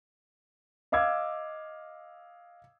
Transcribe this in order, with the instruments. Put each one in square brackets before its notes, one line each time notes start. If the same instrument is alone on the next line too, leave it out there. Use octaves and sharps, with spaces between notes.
[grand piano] D#5 F5 D6 E6 G#6